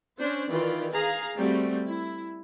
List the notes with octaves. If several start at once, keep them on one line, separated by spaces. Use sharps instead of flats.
C#4 D4 C5
D#3 E3 F4 B4 D5
G#4 F5 A#5
G3 A3 C4 F#4
E4